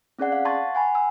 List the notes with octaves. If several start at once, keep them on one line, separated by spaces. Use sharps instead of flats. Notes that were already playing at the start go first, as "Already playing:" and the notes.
C4 C#4 G#4 D5 F#5
F5
F#5 A5 C6 C#6 G#6 A6
F#5 G#5 B5
G#5 E6